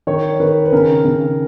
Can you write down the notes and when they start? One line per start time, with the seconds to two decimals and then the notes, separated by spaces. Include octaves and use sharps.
0.07 D#3 C#5
0.40 D#3 B4
0.65 B4
0.72 C#3 A#4
1.05 C#3